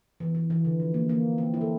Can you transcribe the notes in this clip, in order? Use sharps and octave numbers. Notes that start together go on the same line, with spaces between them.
E3
E3
E3
D3
F3
A#3
A#3
C4
E4
A4